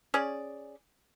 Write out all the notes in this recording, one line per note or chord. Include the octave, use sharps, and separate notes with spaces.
C#4 G#4 D5